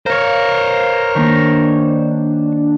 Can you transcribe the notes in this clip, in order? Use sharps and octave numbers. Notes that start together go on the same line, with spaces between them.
A#4 C5 C#5 F5
D#3 A#3 D4